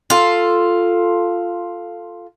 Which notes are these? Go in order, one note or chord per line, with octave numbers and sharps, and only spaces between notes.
F4 A4